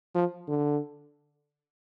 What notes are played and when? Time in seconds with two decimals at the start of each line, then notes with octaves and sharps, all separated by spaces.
0.15 F3
0.48 D3